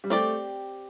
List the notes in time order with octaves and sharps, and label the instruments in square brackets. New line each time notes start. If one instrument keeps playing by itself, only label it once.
[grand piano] G3
[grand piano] A3 [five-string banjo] C4 G4 D5